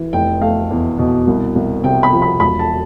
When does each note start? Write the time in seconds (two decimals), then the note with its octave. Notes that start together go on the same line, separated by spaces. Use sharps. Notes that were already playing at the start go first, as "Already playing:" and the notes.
Already playing: E3
0.13 F1 G5
0.41 A3 F5
0.71 E2
0.98 B2
1.27 C2
1.55 C2
1.83 C3 G5
2.03 B5
2.13 F3
2.22 B5
2.40 E1 B5
2.59 A5